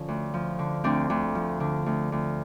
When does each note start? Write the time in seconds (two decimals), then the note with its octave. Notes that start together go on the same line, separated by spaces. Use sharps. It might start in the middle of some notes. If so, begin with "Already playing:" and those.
Already playing: D3 F3 C#4
0.08 D2
0.34 F3
0.59 D3
0.84 D2 C4 D4
1.10 D2
1.35 F3
1.60 D3
1.86 D2
2.12 D2